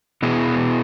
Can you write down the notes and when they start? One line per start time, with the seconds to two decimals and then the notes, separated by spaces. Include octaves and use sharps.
0.22 B2 B3 E4 G#4